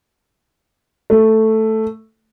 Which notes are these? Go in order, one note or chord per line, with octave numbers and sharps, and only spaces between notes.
A3